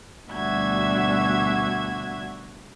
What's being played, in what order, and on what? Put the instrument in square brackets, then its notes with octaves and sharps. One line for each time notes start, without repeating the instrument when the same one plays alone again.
[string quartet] D2 B2 G3 F#4 E5 G#6